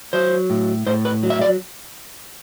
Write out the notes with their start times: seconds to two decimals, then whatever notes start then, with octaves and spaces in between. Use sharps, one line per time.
0.13 F#3 C5
0.50 A2
0.86 A2 C5
1.05 B4
1.23 F#3
1.30 E5
1.41 D5